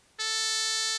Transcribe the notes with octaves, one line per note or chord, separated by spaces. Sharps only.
A4